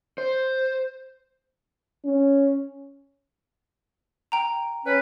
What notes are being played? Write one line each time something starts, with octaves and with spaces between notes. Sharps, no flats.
C5
C#4
G5 A#5
C#4 B4